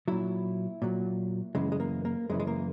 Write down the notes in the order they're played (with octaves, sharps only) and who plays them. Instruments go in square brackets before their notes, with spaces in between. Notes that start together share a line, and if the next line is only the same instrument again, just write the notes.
[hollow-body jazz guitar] A#2 F#3 E4
A#2 F#3
F#2 C#3 E3 G#3
G#3
A#3
A#3
F#2 C#3 E3 G#3
G#3
A#3